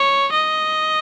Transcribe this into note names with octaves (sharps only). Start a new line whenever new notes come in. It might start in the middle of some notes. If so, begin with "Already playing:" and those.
Already playing: C#5
D#5